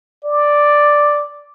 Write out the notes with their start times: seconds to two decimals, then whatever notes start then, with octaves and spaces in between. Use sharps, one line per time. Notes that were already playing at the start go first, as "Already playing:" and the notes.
0.24 D5